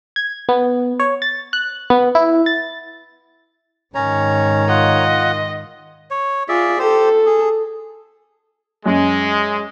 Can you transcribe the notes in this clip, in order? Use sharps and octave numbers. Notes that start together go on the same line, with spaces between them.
G#6
B3
C#5
A6
F#6
B3
E4
A6
G#2 D#3 C#4 C#5 A#5
F4 D#5 F#5
C#5
F4 G#4 D5 E5
G4 A4 C5
G#4
F#2 G#3